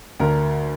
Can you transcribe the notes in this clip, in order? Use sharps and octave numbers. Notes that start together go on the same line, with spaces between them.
D2 D3 A#4